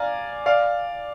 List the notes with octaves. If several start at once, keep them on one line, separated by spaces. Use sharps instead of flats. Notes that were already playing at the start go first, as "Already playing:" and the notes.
Already playing: D5 F5 G#5 A#5
D5 F5